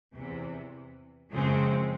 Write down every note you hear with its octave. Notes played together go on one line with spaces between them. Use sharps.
E2 C3 E3
F#2 C#3 F3 G#3 C4